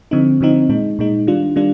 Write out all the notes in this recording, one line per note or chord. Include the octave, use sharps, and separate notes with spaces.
D3 F3 C4 D#4
D3 F3 C4 D#4
A#2 G#3 D#4
A#2 G#3 D#4
D#3 G3 D4 F4
D#3 G3 D4 F4